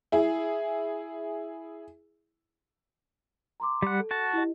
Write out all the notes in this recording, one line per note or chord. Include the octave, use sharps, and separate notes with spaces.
E4 G#4
A#5 C6 D6
G3 F#5
A4
F#4 A5
E4 G4 D#5